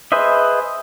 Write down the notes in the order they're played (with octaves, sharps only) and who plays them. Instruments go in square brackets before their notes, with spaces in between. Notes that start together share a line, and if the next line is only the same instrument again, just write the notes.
[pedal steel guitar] G#4 B4 C5 D#5 E5